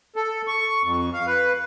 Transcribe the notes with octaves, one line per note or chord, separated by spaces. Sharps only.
A4
C#6
F2
F5
B4